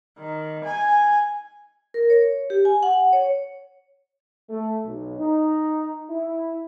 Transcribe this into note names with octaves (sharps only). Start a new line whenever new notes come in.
D#3
G#5
A#4
C#5
G4
G#5
F#5
C#5
A3
B1
D#4
E4